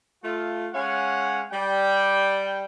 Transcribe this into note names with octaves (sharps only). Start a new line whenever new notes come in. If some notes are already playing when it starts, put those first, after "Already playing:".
A3 F4
G#3 C#4 C#5 F5 F#5 G#5
G3 G5